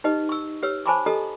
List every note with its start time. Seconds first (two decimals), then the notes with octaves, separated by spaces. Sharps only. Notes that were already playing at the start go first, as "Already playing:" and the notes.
0.04 D#4 G4 B4 D#5
0.29 C#6 E6
0.63 G4 B4 C#5 E6
0.86 C5 G#5 A5 B5 C#6 D6
1.06 G4 A4 D#5 A#5 D#6